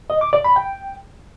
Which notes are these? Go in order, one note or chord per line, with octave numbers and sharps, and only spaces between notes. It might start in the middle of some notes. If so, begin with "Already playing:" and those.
D#5
D6
D5
B5
G5